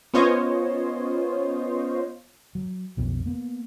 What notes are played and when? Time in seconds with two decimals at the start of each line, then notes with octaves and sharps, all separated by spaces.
0.14 B3 C#4 F4 C5 C#5 D#5
2.55 F#3
2.97 B1 F2 B2
3.26 A#3 B3